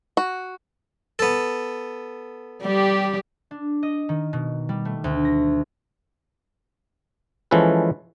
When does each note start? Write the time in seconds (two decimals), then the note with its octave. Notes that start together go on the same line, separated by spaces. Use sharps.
0.17 F#4
1.19 B3 A4
2.63 G3 G4
3.51 D4
3.83 D#5
4.09 D#3
4.33 B2
4.69 G3
4.85 A3
5.04 D2
5.25 A#6
7.51 E3 F3 G#3 C#4 A4 B4